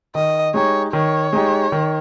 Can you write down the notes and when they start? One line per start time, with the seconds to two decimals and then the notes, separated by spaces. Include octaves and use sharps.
0.15 D#3 D#5
0.54 G#3 D#4 G4 C#5
0.93 D#3 C#5
1.33 G#3 D#4 G4
1.72 D#3